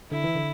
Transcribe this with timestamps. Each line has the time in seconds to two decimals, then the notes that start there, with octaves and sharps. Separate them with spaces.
0.11 D3 E4
0.24 E3
0.35 D3